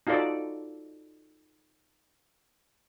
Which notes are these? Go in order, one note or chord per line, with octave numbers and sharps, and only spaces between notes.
D#4 F4 F#4 A4 D5